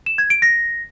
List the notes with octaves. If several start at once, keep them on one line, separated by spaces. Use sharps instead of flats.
E7
G#6
D7
A#6